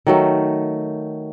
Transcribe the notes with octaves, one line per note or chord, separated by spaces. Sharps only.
D#3 F#3 A3